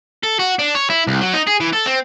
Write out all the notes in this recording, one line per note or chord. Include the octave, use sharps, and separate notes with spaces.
A4
F#4
D4
C#5
E4
C2
F#3
D#4
G#4
E3
A4
C4